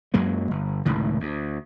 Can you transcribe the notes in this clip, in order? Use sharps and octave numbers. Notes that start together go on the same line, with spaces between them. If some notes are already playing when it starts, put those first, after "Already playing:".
F#2 F#3 G#3 A#3
G1
F1 C#2 A2 D#3
D2